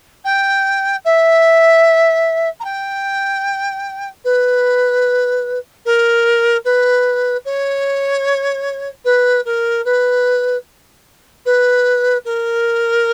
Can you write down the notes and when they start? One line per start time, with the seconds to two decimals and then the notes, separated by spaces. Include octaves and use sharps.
0.24 G5
1.05 E5
2.60 A#5
2.64 G5
4.24 B4
5.85 A#4
6.65 B4
7.45 C#5
9.04 B4
9.45 A#4
9.85 B4
11.45 B4
12.25 A#4